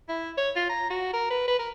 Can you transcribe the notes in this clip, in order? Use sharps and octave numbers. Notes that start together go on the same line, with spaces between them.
E4
C#5
F4
A#5
F#4
A#4
B4
B4
A#4